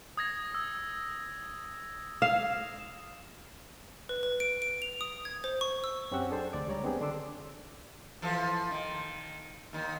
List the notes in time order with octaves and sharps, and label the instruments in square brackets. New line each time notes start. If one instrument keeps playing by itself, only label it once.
[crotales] D#6 G#6 A#6
E6
[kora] F5 [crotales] E7
[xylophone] B4
B4
D7
D7
F7
D#6
G#6
C5
C#6
E6
[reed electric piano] F#2 C4 C#4 G4 F#5 E6
D4 G#4 A4 C5
D2 D5 D6
C#2 G3 C#5 D5 A#5
B3 C4 D4 G4 G#4
D3 D4 C6 D6 E6
[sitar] E3 F3 A4
D#3
D#2 D#3